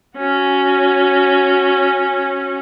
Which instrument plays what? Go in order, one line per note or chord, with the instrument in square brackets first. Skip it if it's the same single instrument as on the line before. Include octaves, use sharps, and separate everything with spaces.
[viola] C#4 F#4